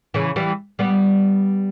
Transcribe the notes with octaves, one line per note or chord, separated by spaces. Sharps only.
C#3 E3
E3 G3
G3 B3